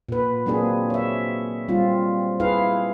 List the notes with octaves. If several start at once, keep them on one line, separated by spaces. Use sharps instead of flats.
A#2 B4
F#3 A#3 C4 D4 G#4
C#5 E5
G3 C4 F4
E4 G#4 B4 F5